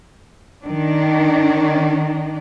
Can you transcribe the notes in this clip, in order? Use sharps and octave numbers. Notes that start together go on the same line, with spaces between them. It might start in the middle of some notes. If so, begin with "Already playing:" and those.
D#3 D4